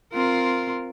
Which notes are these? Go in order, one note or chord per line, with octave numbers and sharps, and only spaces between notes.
C4 F4 A#4